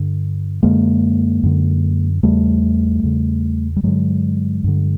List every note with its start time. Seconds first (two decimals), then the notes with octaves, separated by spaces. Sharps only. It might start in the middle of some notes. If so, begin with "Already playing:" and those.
Already playing: G2 D3
0.63 F#2 D3 G#3 A#3
1.43 F#2 D3
2.23 E2 C#3 G3 A3
3.03 E2 C#3
3.76 G3
3.83 G2 D3 F#3 G#3
4.64 G2 D3